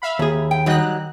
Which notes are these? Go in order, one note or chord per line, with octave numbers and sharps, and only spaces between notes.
E5 F5 B5
D#2 G#4
G5
D#3 F#3 G3 D#4 D#5 F#6